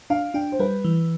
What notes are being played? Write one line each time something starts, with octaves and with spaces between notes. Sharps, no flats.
D4 F5
D4 G5
C5
G3 B4
E3